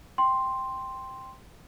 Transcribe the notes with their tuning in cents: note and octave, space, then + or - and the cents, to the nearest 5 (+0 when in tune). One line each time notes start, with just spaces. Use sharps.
G5 +0 C6 +0